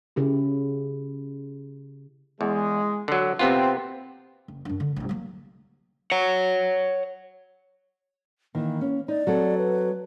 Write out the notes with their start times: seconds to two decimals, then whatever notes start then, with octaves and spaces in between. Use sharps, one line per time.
0.16 C#3 E4 G4
2.41 E2 G#3
3.08 D3 F#3
3.39 C3 B3 C4 F4
4.48 F#1
4.65 F#2 D4
4.80 D3
4.96 A1 B2
5.09 F#3 A#3
6.12 C#5 F#5
8.55 D#3 E3 A#3
8.81 C#4
9.08 D#4 D5
9.27 F#3 C4 A4
9.58 B4